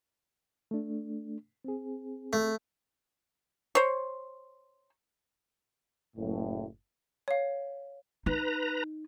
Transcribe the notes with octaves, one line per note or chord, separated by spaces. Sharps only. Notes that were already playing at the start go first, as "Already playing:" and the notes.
A3 D4
C4 G#4
A3
C5 C#5
F#1 A2
C#5 F5
D#4 B4 A#5